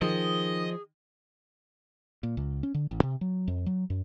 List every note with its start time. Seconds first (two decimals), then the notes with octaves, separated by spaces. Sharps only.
0.02 D#3 F3 G#4 D#5
2.23 A#2
2.37 C#2
2.63 C#4
2.74 D3
2.91 A1
3.03 C3
3.21 F#3
3.48 F2
3.66 F#3
3.90 F#2